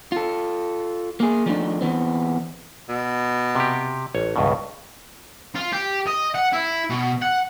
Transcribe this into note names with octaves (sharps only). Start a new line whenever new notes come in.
F4 A4
A#3 G#4
F3 G3 A3 B3 D4 D#4
E3 B3 C4
B2
C3 G4
A1 C#5
C#2 G2 B2
F4
G4
D#5
F#5
E4
B2
F#5